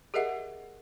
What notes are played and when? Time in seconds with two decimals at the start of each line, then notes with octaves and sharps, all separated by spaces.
0.14 G4 G#4 A#4 D#5 E5 F#5